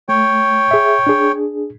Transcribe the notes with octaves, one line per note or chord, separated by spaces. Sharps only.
A3 C#5 G5
G#4 E5
D4 G#4